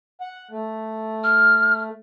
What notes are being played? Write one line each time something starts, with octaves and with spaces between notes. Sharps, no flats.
F#5
A3
F6